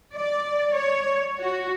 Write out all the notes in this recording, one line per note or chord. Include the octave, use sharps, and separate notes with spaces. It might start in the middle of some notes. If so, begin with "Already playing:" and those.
D5
C#5
F#4